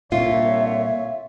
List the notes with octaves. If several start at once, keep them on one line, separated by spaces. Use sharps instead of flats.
C2 A#2 D3 F4 C#5 E5